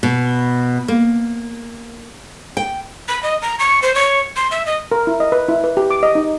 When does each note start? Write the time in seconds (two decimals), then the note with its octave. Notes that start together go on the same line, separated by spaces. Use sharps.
0.03 B2
0.88 A#3
2.57 G5
3.08 B5
3.23 D#5
3.42 A#5
3.59 C#6
3.82 C5
3.95 C#5
4.36 C6
4.51 E5
4.66 D#5
4.92 A#4
5.07 E4
5.20 D#5
5.32 B4
5.48 E4
5.64 B4
5.77 G4
5.91 D6
6.03 D#5
6.15 D#4